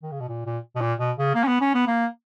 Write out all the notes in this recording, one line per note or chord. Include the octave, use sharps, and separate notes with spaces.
D#3
C#3
B2
A#2
A#2
B2
A#2
B2
C#3
A#3
C#4
B3
C#4
B3
A#3